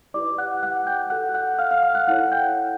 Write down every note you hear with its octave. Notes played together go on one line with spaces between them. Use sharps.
E4 G4 B4 D5 D6
F#5 F#6
F#5 F#6
G5 G6
F#4 A4 D5 F#5 F#6
F#5 F#6
F5 F6
F5 F6
F5 F6
F#5 F#6
E4 A4 C#5 F#5 F#6
G5 G6